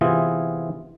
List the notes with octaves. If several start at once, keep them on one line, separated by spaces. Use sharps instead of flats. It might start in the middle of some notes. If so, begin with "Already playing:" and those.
C3 E3 B3 E4 F4 G#4